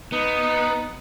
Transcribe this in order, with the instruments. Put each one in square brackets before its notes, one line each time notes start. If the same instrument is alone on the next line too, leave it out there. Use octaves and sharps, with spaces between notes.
[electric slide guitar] B3 [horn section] D#4